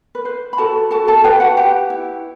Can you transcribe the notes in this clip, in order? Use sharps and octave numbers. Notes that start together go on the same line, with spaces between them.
B4
B4 C5
B5
F#4 A4 A5
F#4 A4 A5
A4 A5
G4 B4 G5
F#4 F#5
G4 B4 G5
E4